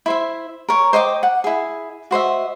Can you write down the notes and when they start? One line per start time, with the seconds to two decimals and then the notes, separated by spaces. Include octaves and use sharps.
0.06 E4 C5 E5
0.69 A#4 C#5
0.93 C5 D#5 G5 D6
1.23 F#5
1.44 E4 G#4
2.11 F#4 C5 D#5 E5